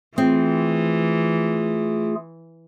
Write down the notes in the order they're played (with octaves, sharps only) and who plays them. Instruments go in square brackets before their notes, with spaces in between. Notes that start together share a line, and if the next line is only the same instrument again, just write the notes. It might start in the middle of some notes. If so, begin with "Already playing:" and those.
[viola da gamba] E3 [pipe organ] A3 F4 G#4 [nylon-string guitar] C4